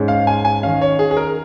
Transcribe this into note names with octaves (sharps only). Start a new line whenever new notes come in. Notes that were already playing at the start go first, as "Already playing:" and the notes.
Already playing: G#2 G#3 C#4
F5
G#5
G#5
D#3 C#4 F5
C#5
G#4
G#4
A#4